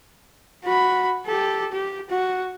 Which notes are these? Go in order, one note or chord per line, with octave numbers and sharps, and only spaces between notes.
F#4 B5
G4 A4
G4
F#4